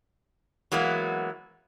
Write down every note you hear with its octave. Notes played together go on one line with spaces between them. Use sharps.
E3 F#3 G#3 A#3 B3